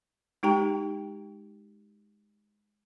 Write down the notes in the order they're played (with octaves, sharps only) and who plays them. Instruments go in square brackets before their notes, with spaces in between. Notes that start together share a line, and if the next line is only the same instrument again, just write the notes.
[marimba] G#3 D#4 G4 G5 A#5